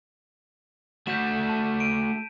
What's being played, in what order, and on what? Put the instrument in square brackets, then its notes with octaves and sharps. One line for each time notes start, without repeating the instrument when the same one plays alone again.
[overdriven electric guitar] A3 F#4 [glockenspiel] G6 B6 E7
[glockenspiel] A5
D7 D#7